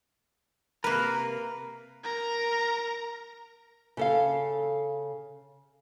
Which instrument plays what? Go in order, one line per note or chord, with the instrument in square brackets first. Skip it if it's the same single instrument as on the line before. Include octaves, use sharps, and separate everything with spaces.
[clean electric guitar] C3 A#4 [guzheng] A#3 B4
[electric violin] A#4 A#5
[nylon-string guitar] C#3 A4 F5